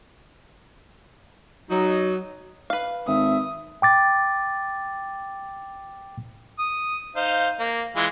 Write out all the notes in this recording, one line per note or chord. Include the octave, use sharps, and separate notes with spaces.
F#3 D#4
B4 F5
G#1 E5 D#6
G5 D6 A6
D#6
D#4 C5 F5
A#3
E3 G#3 F4